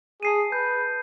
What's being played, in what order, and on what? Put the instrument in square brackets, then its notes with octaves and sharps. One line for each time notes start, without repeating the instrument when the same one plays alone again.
[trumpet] G#4 [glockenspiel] A5 C7 D#7
[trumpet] B4 [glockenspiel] G6